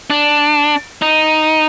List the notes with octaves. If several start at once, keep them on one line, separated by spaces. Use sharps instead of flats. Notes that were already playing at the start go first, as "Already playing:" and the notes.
D4
D#4